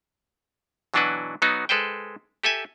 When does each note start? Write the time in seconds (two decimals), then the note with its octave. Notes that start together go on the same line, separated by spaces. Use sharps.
0.94 B2 E3 F#3 D4 F#4 B4
1.42 F#3 B3 D#4 F#4
1.69 G#3 A4 B4 C5 G5
2.43 G4 A4 E5 G#5